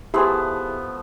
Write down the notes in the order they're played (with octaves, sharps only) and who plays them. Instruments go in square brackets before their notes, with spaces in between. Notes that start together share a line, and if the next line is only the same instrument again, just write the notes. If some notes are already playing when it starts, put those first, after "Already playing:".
[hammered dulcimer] F3 A3 B3 [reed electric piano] E4 G#4 [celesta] G4 C6